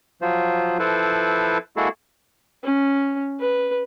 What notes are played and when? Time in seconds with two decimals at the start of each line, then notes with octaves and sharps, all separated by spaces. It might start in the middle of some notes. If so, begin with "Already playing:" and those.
0.22 F3 F#3 F4 C5
0.79 F3 E4 A4 B4 C5
1.76 G#3 A#3 E4 F#4 G#4 A4
2.64 C#4
3.40 B4